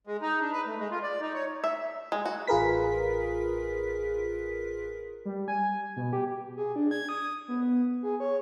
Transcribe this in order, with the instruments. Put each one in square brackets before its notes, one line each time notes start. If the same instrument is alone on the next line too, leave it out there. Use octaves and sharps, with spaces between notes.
[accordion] G#3
D#4
D4
B4
A3
G#3
F4
D5
D#4
C#5
[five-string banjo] E5
G#3
F#4
[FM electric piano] A1 F4 G#4 A#4 B4 B6
[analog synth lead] G3
G#5
B2
G4
[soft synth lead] G#4
D4
G#6
D#6
B3
G#4
C#5